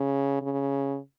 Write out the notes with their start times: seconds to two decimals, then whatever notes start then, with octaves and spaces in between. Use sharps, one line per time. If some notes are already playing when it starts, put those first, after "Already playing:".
Already playing: C#3
0.41 C#3